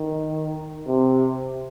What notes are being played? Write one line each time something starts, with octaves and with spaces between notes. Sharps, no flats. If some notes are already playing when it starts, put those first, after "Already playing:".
Already playing: D#3
C3